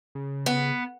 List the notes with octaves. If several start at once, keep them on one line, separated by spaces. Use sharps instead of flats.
C#3
B3